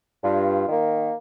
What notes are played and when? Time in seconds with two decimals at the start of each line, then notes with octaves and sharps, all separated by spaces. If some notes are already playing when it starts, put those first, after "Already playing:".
0.24 G2 F4
0.69 D#3 A#3